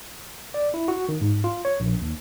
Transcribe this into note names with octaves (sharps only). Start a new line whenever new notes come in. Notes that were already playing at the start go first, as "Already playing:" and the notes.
D5
E4
F#4
D#3
G#2
F4
C#5
A#1
D#2